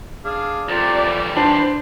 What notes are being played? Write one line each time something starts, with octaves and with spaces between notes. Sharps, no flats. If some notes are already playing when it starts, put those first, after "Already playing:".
D4 G#4 F5
C2 C3 F3 A3 D5
E3 G3
D4 B4 C5